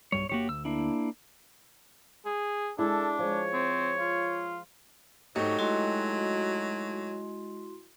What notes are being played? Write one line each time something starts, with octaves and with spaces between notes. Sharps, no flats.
B1 G2 G3 C#5
G1 D3 A#3 F#4 G4 C#5
D2 E6
A#3 D4 E4
G#4
G#3 D4 E4 A4
F3 G#3 C#5
C4
F4
G#2 F#3 A3 D#4 G4 C#6
G#3 E4 F#4 C6